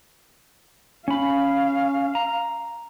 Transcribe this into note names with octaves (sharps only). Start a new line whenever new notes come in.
C#4 F5 B5
A#5